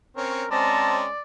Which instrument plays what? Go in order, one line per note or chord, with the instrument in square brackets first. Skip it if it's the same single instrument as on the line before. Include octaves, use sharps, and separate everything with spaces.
[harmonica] C4 C#4 C#5 [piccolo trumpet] A#4
[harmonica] G#3 C#4 [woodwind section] C4 A#5 [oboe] D5 [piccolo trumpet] A5